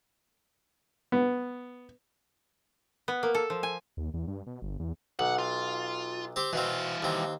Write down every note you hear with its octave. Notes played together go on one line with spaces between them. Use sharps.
B3
B3
A#3
A4
F3
G#5
D#2
E2
G2
B2
G1
E2
B1 F#5
F4
C4 G4
B2 E3 C4 F5
D#2 C4